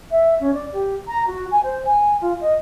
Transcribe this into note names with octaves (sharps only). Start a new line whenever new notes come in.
E5
C#4
D5
G4
A#5
F#4
G#5
C5
G#5
F4
D#5